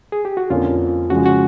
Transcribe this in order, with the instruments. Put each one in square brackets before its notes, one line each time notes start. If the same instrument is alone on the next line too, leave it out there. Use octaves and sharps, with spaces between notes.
[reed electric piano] G#4
G4
F#4
[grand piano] F2 D3 F3 A#3 C#4 [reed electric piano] F4
[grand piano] C#3 F3 G#3 [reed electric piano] F#4
[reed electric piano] F#4